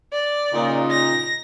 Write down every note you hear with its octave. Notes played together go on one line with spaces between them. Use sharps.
D5
A#2 C#3 D#4
A#6